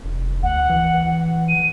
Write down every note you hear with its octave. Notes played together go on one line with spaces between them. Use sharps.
F1
D2 F#5
E3
D#7